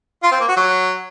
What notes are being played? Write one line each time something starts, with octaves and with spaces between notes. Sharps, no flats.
F4
C4
A#3
F#4
F#3